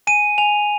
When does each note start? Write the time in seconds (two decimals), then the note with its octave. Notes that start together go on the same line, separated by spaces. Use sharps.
0.07 G#5 D#7
0.38 G#5 F7